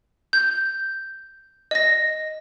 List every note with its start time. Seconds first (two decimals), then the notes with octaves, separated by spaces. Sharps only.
0.33 G6
1.71 D#5 A#6